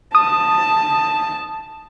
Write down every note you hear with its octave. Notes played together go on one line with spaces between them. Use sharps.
A5 D#6